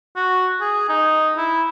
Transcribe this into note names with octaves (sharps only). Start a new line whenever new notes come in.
F#4
G#4
D#4
E4